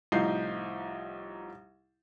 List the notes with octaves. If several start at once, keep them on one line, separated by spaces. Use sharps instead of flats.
C2 A2 F3 D#4 G6 C7